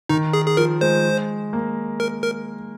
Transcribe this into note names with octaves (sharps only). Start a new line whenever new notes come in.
D#3 D#4
G#4
G#4
F3 A#4
G#3 C5
A#3
A#4
A#4